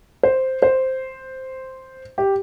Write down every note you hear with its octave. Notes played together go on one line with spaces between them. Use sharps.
C5
C5
G4